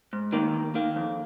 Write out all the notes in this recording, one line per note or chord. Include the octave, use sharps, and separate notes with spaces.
G#2
D#3 A#3
D#2
D#3 A#3
F2